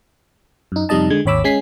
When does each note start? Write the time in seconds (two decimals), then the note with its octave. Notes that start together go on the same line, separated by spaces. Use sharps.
0.72 F#2 D#4
0.89 F2 C3 G3 D#4 D#5 A5
1.10 D3 G#3 G#6
1.25 G#1 D#2 C#5 B5 D6 E6
1.44 G#3 C#4 G#5 B6 C7